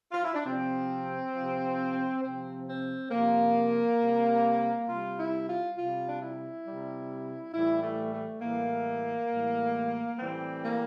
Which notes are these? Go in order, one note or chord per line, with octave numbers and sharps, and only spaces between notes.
F4
E4
D4
C3 F3 C4
C3 F3
C3 F3 C4
C4
C3 F3 A#3
C3 G3
C3 G3 F4
E4
F4
C3 G3 F4
D4
E4
C3 G3
A2 E3 G3 E4
A3
A3
A2 E3 G3 A#3
A2 E3 G3
A2 E3 G3 C4
A#3